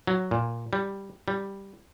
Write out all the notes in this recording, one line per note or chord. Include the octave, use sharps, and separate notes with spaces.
F#3
A#2
G3
G3